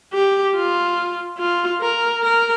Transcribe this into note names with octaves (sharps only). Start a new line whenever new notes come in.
G4
F4
F4
A#4
A#4